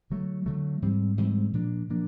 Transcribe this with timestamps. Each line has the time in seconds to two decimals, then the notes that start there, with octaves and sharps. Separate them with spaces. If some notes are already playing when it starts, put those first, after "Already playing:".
0.10 D3 F#3 A3
0.46 D3 F#3 A3
0.82 G#2 E3 G3 C4
1.17 G#2 E3 G3 C4
1.53 A#2 F3 A#3 D4
1.89 A#2 F3 A#3 D4